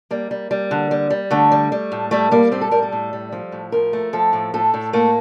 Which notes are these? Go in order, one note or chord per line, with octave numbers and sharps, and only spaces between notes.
G3 A#3
G3
G3
D3
G3
G3
D3 A3
G3
G3
A2
G3 A3
G3 A#3
A2 C4
A4
G3 A#4
A4
A2
G3
F3
A2
F3 A#4
A3
F3 A4
A2
A2 A4
A2
A3 A#3